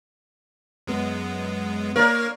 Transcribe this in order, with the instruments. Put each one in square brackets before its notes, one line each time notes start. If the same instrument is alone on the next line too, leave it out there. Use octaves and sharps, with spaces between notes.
[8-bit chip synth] F#2 G#3 B3
[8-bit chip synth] A#3 C#5 F5 [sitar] A#4 D5